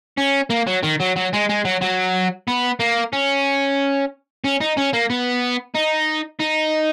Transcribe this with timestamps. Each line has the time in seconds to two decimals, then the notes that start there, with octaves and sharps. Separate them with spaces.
0.18 C#4
0.50 A#3
0.67 F#3
0.83 D#3
1.00 F#3
1.16 F#3
1.33 G#3
1.49 G#3
1.65 F#3
1.81 F#3
2.48 B3
2.80 A#3
3.13 C#4
4.44 C#4
4.61 D#4
4.77 C#4
4.93 A#3
5.10 B3
5.75 D#4
6.40 D#4